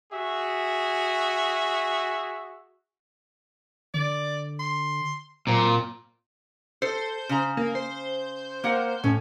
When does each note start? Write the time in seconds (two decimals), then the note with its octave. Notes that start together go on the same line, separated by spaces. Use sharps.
0.11 F#4 G#4 E5
3.94 D3 D5
4.59 C6
5.47 A#2 F#3 C4
6.82 A4 C5
7.29 C#3 A#5
7.57 A#3
7.75 C5
8.64 A#3 A#4 F#5
9.04 A2 C#4